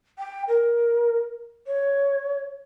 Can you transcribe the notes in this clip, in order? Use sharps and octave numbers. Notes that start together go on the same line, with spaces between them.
G5
A#4
C#5